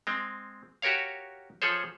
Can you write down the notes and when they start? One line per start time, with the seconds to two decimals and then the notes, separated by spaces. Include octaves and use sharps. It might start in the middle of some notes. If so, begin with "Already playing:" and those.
0.07 G#3 C4
0.82 F#4 G4 A#4 C#5 F5
1.62 F3 G#4 A4 C5 C#5